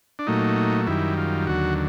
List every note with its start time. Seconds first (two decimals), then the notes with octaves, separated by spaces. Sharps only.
0.19 D4
0.27 A#2 F#3 A3 D#4
0.87 F#2 D#3 G3 E4
1.18 F4
1.47 D#2 D3 F#3 F#4